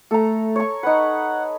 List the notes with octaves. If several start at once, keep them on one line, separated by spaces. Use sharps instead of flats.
A3 A4 A#5
C#5 C#6
D#4 B4 F#5